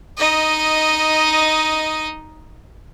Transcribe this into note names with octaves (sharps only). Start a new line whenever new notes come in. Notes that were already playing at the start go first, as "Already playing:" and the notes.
D#4 D#5